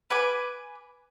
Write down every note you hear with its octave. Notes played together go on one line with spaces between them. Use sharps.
B4 G#5 D6